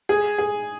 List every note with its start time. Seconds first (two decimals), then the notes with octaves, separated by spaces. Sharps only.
0.09 G#4
0.38 G#4